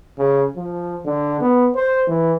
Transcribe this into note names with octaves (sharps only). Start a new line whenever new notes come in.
C#3
F3
D3
B3
C5
E3